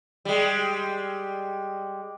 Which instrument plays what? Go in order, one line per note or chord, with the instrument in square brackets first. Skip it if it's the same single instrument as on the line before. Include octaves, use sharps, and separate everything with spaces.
[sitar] G3 G#3